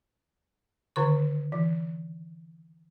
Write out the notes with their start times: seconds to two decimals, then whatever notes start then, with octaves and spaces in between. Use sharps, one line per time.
0.96 D3 D#3 C#6
1.52 E3